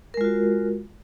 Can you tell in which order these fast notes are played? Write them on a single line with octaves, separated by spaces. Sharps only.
A#4 G#3 F4 F#4